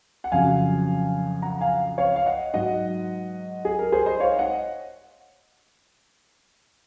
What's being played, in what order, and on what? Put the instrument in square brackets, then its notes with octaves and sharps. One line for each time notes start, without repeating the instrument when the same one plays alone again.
[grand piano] F#5
F2 C#3 F#3 F5 G#5
F#5 A#5
F5 G#5
C#5 F5
F5
D#5 F#5
G#2 F#3 D#5 F#5
G#4
A#4
G#4 C5
C5 D#5
C#5 F5
D#5 F#5